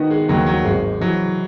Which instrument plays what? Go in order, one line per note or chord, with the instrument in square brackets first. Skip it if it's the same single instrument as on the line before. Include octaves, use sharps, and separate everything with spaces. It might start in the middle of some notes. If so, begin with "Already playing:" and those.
Already playing: [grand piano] D#3 [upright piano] B3 D#4 F#4
[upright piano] G#3
[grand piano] D#2 [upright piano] F#3
[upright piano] F#3
[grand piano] G#1 [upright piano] G#3
[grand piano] E3 [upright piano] F#3